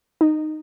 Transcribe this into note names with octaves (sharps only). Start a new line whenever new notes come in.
D#4